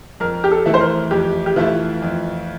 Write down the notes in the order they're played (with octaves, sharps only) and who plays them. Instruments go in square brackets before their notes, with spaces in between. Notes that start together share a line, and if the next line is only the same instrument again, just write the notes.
[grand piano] F2 [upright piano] A#4
[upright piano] G4
A4
[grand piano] E3 A3 E4
[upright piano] C5
A#4
[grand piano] F2 [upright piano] G4
[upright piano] G4
[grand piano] E3 A3 E4 [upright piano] F4
[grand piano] F2